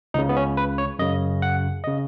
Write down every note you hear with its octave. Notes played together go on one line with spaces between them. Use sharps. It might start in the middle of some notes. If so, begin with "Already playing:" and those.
C#2 C#3 D#4
B3
C#4
B4
C#5
F#2 C#3 D#5
F#5
C#3 D#5